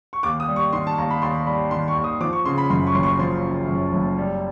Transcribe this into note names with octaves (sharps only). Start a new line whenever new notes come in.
C#6
D#2 D6
D#6
G3
C#6
D#3 C6
A5
D#2 A#5
B5
D#2 C6
G3 B5
D#3 C6
C#6
D#2
D#6
F3 D6
C#6
C#3 C6
B5
F#2 C6
C#6
F#1 C6
C#6
F3 C6
C#3
F#2
F#1
G3